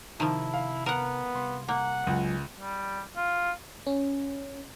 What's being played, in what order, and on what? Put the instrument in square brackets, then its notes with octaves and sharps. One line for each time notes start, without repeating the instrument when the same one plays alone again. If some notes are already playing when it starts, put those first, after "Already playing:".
[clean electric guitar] C3 A5 [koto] D#3 F3 [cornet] E4
[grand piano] F5
[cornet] B3 [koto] A#4 F#5
[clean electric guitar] C2 C6
[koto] A#3 [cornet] F#5
[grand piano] C#2 [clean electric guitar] F#3 F4 G#5
[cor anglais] G3
F4
[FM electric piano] C#4